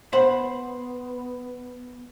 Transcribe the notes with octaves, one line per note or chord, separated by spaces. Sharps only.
B3 C5 F#5 B5